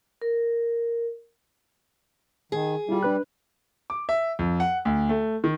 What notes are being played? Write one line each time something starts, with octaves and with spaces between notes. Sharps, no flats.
A#4
D#3 G#4
G3 E4 F4
D4 B4 F#6
D6
E5
F2
F#5
D2
A3
D#3